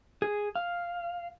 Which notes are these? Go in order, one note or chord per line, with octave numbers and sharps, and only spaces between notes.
G#4
F5